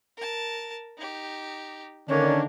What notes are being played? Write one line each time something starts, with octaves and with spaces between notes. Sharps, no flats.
A#4 A5
D#4 G4
D3 D#3 A#3 C#4 D4